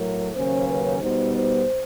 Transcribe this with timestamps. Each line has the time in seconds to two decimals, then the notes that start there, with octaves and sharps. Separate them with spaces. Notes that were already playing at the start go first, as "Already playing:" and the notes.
Already playing: A2 F#3 A3 A#4
0.35 D#2 C#3 F#3 A#3 C#4 C5
0.67 B4
1.00 B2 G3 B3 D#4 C5
1.34 C5